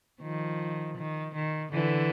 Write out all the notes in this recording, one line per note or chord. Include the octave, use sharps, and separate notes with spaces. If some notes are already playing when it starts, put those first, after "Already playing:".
D#3 F3
D#3
D#3
D3 E3